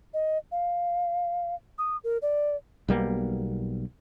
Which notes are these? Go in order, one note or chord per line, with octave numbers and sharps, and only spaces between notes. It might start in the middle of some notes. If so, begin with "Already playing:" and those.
D#5
F5
D#6
A#4
D5
B1 G3 A#3 B3